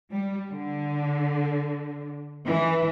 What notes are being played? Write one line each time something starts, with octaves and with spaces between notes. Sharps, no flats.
G3
D3
E3